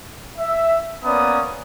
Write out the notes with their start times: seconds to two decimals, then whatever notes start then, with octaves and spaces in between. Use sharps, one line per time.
0.38 E5
1.05 A#3 B3 C#4 D5 A#5 D#6